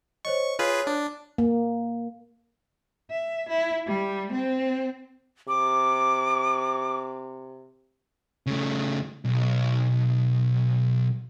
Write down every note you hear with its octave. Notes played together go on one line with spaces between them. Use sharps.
C5 C#5 D#5 C#6
F4 G#4 B4 C#5
D4
A#3
E5
E4
G3
C4
C3 D6
C#3 A3
B1